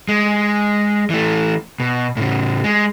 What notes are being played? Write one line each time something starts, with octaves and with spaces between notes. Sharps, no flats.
G#3
E3 A3
B2
A2 C#3
G#3